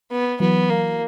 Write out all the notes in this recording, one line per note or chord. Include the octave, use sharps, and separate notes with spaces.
B3
E3 F#3 B3
A#3